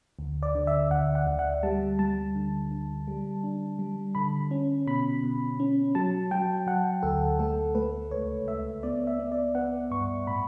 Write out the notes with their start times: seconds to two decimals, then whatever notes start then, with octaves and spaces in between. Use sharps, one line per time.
0.19 D2
0.43 D5
0.55 D3
0.67 E5
0.91 D2 F#5
1.15 F#5
1.27 D2
1.39 F#5
1.63 G3 A5
1.99 G3 A5
2.35 D3
2.72 D3
3.08 G3
3.44 D4
3.79 G3
4.15 D3 B5
4.51 C#4
4.87 B2 B5
5.23 B2
5.60 C#4
5.95 F#3 A5
6.31 F#3 G5
6.67 F#3 F#5
7.03 D2 A4
7.39 A3 A4
7.75 A3 B4
8.11 C#2 C#5
8.47 C#2 E5
8.83 B3 D5
9.07 E5
9.19 B3
9.32 D5
9.55 B3 F#5
9.91 G2 C#6
10.27 A2 B5